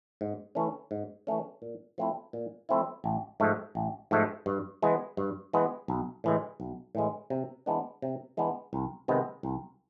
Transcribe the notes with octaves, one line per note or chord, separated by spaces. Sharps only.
G#2
E3 A3 C#4
G#2
E3 A3 C#4
A#2
F3 A3 C4 E4
A#2
F3 A3 C4 E4
A1
G#2 F3 A3
A1
G#2 F3 A3
G2
E3 G#3 B3
G2
E3 G#3 B3
B1
A2 E3 G#3
B1
A2 E3 G#3
C3
E3 G#3 B3 D4
C3
E3 G#3 B3 D4
C2
C3 D#3 G#3 B3
C2